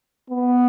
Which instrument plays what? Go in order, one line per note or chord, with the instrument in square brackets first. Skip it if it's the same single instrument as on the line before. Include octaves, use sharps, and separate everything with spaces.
[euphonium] B3